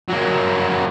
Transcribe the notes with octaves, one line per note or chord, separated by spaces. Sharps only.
F#3 A#3